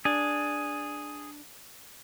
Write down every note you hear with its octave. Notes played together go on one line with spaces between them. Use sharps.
D4 G#4